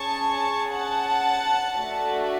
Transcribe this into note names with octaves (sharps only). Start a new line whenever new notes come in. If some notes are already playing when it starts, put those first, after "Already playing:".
Already playing: C#4 G#4 A5 C#6
F#5 A5
A3 D4 F#4 A4